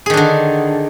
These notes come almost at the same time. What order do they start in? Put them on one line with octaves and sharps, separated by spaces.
G#4 D#3 D4 D3